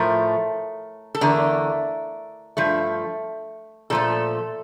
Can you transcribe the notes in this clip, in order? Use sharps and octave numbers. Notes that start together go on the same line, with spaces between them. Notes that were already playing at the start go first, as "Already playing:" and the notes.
Already playing: A2 F3 A3 A#4
A4
E2 D3 A3 A#4
G2 F3 A3
A#2 F3 A3 A4